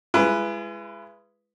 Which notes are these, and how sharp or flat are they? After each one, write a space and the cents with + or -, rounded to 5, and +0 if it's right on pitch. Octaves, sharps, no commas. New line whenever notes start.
G#3 +0 E4 +45 B4 +0